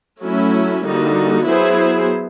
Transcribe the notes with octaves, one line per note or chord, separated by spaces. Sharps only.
F#3 A3 C#4 E4
D3 G3 A#3 D#4 F#4
F#3 B3 E4 G#4 C5